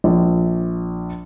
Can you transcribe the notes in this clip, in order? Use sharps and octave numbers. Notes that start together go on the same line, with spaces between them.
A#1